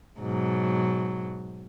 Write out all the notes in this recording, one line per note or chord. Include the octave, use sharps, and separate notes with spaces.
G#2 B2 F#3